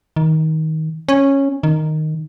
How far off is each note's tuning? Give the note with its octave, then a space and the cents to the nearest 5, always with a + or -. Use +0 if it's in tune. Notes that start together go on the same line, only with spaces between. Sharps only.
D#3 +20
C#4 -10
D#3 -5